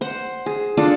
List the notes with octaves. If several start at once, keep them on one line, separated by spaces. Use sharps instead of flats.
C5 F#5
G#4
D4 F4 A4 D5